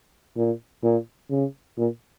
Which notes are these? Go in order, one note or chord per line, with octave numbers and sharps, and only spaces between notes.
A#2
A#2
C#3
A#2